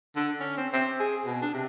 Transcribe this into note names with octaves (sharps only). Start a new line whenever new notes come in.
D3
C#4
C4
C4
G#4
B2
D4
C3